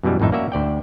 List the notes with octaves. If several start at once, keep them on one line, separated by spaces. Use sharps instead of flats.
F#2 B2 E3 G3 G#3
G#1 F2 A2 D#4 E5
A#3 C#4 F#4 D5 E5
D2 D5 G5